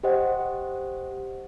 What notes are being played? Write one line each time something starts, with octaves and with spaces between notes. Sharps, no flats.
G4 C5 D#5 F#5